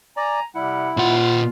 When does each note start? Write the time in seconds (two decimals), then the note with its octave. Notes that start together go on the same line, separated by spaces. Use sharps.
0.17 D5 G#5 A#5
0.55 C3 G3 E4 F#5
0.97 A#2 F4 F#5